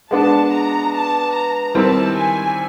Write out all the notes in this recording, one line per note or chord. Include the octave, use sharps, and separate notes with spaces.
G#3 B3 D4 A5
A#5
A5
A#5
D#3 G3 C4 E4 A5
G#5